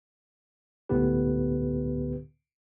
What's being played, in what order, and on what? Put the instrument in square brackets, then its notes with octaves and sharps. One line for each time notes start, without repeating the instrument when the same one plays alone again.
[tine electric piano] C#2 A2 D3 B3 G4 B4